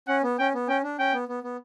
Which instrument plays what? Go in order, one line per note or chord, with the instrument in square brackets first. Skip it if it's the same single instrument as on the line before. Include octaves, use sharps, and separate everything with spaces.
[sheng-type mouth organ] C#4 [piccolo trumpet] F#5
[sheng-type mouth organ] B3
[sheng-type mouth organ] C#4 [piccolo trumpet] G5
[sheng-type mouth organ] B3
[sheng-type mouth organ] C#4 [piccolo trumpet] G5
[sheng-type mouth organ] D4
[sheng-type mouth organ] C#4 [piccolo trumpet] G5
[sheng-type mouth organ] B3
B3
B3